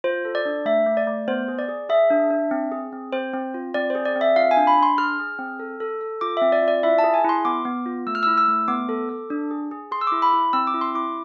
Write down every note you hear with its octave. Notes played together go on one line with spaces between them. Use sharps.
F4 C5
A4
D5
D4
A3 E5
A3
D5
A3
B3 C5
G#4
D5
G#4
G#4 E5
D4
D4
C4
G#4
C4
C4 C5
C4
F4
C4 D5
G#4 C5
D5
C4
E5
F4 F5
G#5
D4
B5
D4
C6
G#4 F6
G#4
C4
A4
A4
A4
F4 D6
C4 E5
D5
F4
D5
E4 E5
A5
G#4
G#5
E4 C6
B3 D6
B3
F4
A3 E6
F6
E4 E6
E6
A3
B3 D6
A4
A4
D4
G#4
G#4
G#4 C6
E6
E4 D6
B5
E4
C4 E6
D6
E4
C6
E4 D6